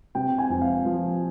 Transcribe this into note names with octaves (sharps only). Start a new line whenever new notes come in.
C3 G5
G#5
F2
F5
F3